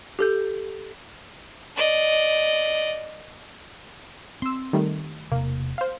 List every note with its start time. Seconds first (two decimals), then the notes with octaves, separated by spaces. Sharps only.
0.19 G4 A4 G6
1.76 D5 D#5
4.42 C4 C6 E6
4.73 D#3 G3 A3
5.32 E1 C3 A#3
5.78 C5 F5